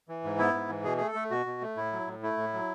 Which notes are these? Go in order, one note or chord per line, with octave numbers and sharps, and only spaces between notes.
E3
G#2
B3 E4
G#2
E3
B2 G#4
A3 G#4
A4
A3
B2 F#4
B2
A3
A2 E4
F#3
A2
A3 E4
A2
F#3